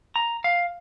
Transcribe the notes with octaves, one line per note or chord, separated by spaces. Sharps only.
A#5
F5